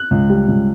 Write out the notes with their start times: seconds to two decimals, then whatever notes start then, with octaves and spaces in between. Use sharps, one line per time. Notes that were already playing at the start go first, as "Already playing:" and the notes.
Already playing: F#6
0.11 C#2
0.30 G3
0.48 C#2